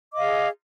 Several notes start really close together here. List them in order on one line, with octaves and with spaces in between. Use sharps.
D6 D#5 F5 G#4